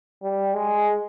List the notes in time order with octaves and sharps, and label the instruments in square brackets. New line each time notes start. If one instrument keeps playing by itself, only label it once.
[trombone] G3
G#3